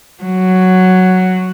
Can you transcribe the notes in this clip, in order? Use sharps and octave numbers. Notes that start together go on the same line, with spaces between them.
F#3